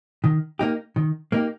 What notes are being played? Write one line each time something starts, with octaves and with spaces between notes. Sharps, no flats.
D#3
A#3 D#4 G4
D#3
A#3 D#4 G4